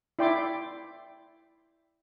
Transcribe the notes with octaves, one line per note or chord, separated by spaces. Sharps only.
E4 D5 G5 C6 D6